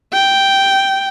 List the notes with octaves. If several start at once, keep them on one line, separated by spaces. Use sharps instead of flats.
G5